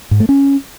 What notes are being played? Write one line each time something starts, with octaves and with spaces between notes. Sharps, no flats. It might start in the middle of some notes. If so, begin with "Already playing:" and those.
G#2
A3
C#4